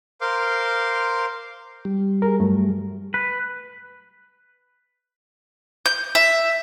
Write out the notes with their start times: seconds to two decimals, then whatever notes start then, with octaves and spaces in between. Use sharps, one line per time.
0.21 A#4 C5 F5 C6 D6
1.85 G3
2.22 G#4 A#4
2.40 G2 F#3 A3
3.14 B4
5.86 G6
6.15 E5